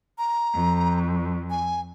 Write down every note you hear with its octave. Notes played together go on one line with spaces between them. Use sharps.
A#5
F2
G#5